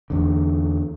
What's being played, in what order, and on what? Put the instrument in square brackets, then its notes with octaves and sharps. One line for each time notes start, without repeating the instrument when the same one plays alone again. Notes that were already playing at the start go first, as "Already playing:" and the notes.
[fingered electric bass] E2 D3